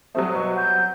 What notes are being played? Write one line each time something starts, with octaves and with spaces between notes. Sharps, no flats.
F#3 G3 A3 C4 D#6
B2 C#6
B3 G6